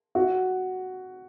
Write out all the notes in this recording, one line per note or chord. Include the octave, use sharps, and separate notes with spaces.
F#4